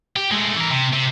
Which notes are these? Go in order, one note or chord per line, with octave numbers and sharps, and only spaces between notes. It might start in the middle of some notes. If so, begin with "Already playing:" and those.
G4
G#3 A3
E3 A#4
C3
C3